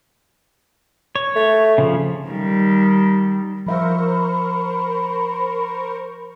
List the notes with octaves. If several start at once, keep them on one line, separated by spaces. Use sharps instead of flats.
C#5
A3
C#3 F3
D#3 G3
F3 A#4 C5 E5 F5 B5 C#6